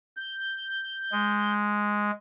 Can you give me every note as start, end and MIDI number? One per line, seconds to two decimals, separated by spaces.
0.17 1.54 91
1.12 2.11 56